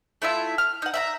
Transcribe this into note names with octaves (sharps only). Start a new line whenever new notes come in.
A3 E4 F4 E5
F6
D#4 F#5
E5 F#5 A#5